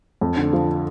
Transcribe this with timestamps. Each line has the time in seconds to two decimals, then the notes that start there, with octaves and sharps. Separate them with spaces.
0.21 F2
0.37 D3
0.53 F3